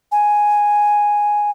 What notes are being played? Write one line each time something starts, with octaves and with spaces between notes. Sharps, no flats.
G#5